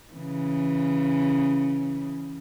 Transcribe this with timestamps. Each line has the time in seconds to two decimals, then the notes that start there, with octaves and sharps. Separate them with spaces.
0.14 C#3 E3